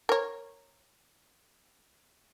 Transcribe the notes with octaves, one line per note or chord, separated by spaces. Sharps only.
A#4 C#5